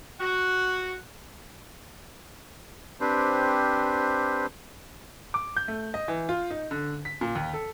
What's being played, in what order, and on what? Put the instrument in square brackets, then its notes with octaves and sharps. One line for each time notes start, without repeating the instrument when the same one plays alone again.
[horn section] F#4
[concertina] C4 D4 G4 B4 C5
[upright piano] D6
G6
A3
D#5
E3
F4
D#4
D3
B6
A#2
D#2
A4